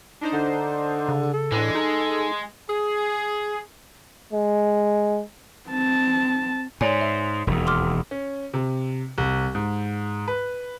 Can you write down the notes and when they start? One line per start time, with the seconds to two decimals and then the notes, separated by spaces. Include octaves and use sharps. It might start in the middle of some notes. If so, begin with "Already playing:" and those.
0.21 D4 D#4 C5
0.33 D3
1.09 C#3
1.34 A4
1.52 A2 E3 G#3 D4
1.75 D#4 G#4
2.70 G#4
4.33 G#3
5.69 C4 A5
6.81 G#2 C#5 D5 G#5
7.01 E5
7.47 E1 D#2
7.67 C6 D6 F6
8.11 C#4
8.54 C3
9.18 C2
9.55 G#2
10.28 B4